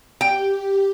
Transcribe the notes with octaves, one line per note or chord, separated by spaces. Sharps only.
G4 G5